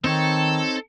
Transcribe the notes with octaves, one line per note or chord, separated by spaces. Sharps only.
D#3 C4 D#4 A4 C#5